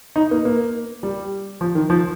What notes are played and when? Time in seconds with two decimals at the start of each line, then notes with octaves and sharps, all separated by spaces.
0.16 D#4
0.31 A#3
0.45 A#3
1.03 G3
1.61 F3
1.75 D#3
1.90 F3